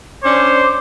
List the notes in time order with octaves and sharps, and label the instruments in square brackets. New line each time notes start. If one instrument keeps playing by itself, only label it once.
[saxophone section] C#4 D4 [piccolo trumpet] C5 [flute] D6